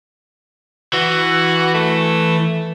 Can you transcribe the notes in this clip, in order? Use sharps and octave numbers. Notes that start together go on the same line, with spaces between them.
E3 F#4
A3